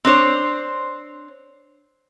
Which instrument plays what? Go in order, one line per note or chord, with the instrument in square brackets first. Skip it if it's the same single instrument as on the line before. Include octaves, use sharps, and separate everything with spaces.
[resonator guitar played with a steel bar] C4 D4 C5 C#5